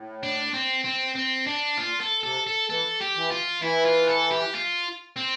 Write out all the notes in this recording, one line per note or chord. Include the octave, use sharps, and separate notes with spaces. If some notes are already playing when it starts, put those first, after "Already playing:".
Already playing: A2
D4
C4
C4
C4
D4
A#2 F4
A4
C3 A4
A4
E3 A4
G4
E3
F4
E3 E4
F4
A4
G4
F4
C4